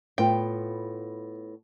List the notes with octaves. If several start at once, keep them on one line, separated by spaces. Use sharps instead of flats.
A2 B3 F4 G5